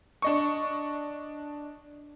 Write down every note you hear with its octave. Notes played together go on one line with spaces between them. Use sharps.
D4 D#5 C#6